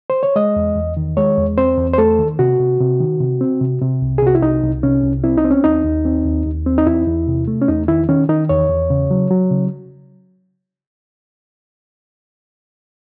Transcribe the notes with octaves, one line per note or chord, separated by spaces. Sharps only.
C5
C#5
G#3 D#5
E2
E2
D#3
G#3 C#5
E2
C4 C5
E2
C5
A3 A4
D#3
C3 F#4
C3
C3
D#3
C3
C4
C3
C3
C2
G#4
C3 F#4
E4
C2 D#4
C2
C3 C#4
C2
C4 E4
D#4
C4
C#4
D#2 D#4
D#2
C4
D#2
D#2
C4
D#4
E2 E4
E2
C3
A3
C#4
E2 D#4
D#3 E4
D#3 C#4
D#3 D#4
E2 C#5
E2
C#3
F#3
F#3
C#3